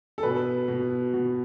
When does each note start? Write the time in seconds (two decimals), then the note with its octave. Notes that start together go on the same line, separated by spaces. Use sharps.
0.18 A4
0.23 B2 B4
0.68 B2
1.14 B2